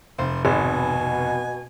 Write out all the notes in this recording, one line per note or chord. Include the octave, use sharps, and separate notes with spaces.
F1 C5
G#1 B2 G#5